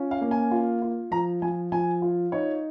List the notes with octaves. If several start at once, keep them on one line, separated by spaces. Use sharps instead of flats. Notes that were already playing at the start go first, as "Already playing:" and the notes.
Already playing: C#4 F4
F5
A#3
G#5
F4
F4
F3 A#5
F3 G#5
F3 G#5
F4
D#4 C#5